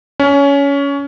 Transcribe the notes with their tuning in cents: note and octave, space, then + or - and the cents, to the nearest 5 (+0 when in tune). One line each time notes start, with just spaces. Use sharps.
C#4 +20